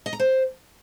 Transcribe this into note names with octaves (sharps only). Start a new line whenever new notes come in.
D#5
A#5
C5